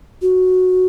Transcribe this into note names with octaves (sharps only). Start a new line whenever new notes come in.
F#4